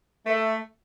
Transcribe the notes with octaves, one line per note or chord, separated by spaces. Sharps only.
A3